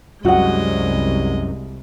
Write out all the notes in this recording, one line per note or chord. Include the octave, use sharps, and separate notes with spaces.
C2 F#2 G#3 F#4 D#5 F#5